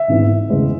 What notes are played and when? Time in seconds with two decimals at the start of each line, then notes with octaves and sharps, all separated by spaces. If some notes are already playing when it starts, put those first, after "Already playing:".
Already playing: E5
0.08 G#1 G#2 E3 B3
0.50 E2 C#3 G#3 B3